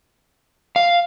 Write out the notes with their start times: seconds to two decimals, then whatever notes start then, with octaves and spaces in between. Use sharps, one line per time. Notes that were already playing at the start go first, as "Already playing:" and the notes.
0.76 F5